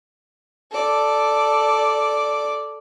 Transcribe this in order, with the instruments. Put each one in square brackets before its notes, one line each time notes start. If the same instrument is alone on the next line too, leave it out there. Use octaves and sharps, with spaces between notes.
[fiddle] A4 D5